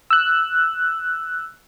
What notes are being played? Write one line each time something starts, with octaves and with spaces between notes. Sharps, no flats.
E6 F#6